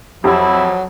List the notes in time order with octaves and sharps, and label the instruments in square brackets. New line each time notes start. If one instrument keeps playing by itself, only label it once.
[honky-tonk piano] F2 [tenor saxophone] F#3 [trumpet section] E4 [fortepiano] G4